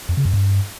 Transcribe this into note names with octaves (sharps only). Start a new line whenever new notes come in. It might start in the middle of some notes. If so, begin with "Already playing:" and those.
F2
C#3
F#2
G2